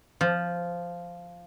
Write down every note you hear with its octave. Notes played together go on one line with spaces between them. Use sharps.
F3